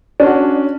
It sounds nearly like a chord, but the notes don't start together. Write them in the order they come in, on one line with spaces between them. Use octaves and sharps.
C#4 D4 F#4